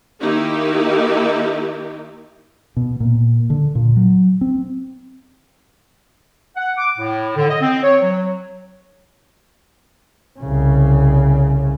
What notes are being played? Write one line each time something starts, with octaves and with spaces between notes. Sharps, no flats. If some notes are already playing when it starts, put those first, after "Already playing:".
D#3 A#3 D#4 E4 G4
B2
A#2
D3
A#2
F#3
C4
F#5
D6
A2
D3
D#5
C4
C#5
F#3
C2 C#3